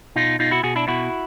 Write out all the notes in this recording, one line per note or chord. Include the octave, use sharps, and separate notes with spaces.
B2 D#4 F4
B2 D#4 F4
E4 F#4
B2 F#4 G#4
D4 E4
B2 E4 F#4